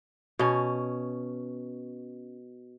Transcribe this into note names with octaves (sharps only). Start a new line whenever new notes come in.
B2 C#4